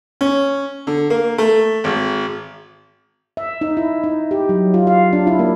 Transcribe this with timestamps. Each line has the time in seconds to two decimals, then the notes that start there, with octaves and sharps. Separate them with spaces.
0.21 C#4
0.87 D3
1.10 A#3
1.38 A3
1.84 G#1
3.37 E5
3.61 D#4
3.77 E4
4.04 D#4
4.31 G4
4.49 F#3
4.74 F4
4.87 F5
5.13 D4
5.27 E4
5.39 A#3